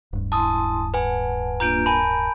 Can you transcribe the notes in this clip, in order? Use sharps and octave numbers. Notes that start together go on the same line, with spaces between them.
D1 G2
E4 G#5 A5 C6 D#6
B4 F#5 G#5 A5
A#3 D4 F4 A#5 G6 D7
A#4 G#5 A5 B5